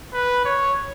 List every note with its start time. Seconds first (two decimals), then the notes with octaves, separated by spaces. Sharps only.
0.13 B4
0.45 C#5